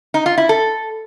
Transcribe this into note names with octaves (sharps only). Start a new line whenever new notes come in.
D#4
F4
E4
A4